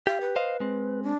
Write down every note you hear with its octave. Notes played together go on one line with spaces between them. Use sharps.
G4 F5
B4
C5 D#5 F5
G#3 C4
D4